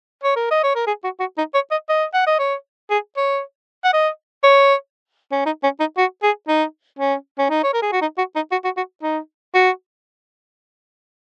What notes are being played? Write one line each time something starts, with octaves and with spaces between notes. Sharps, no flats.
C#5
A#4
D#5
C#5
A#4
G#4
F#4
F#4
D#4
C#5
D#5
D#5
F#5
D#5
C#5
G#4
C#5
F#5
D#5
C#5
C#4
D#4
C#4
D#4
F#4
G#4
D#4
C#4
C#4
D#4
C#5
A#4
G#4
F#4
D#4
F#4
D#4
F#4
F#4
F#4
D#4
F#4